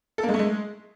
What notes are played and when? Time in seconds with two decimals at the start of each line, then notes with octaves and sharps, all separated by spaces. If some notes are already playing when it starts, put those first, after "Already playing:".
0.18 A4
0.23 A#3
0.29 G#3
0.34 A3
0.39 G#3